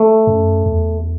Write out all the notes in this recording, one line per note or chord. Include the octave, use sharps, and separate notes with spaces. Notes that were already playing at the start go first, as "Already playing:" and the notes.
Already playing: A3
F#2
E2